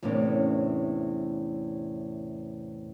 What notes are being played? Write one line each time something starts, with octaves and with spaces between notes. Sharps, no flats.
E2 A2 C3 A#3 C#4 D4